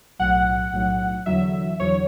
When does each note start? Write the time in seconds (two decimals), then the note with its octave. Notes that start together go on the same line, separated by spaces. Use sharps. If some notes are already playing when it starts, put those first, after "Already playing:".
0.19 B1 A2 F#3 F#5
0.73 B1 A2 F#3
1.26 E2 D3 F#3 E5
1.79 E2 D3 F#3 C#5